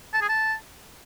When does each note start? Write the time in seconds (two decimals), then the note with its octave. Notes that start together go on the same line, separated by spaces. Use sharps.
0.13 A5
0.21 G#4
0.29 A5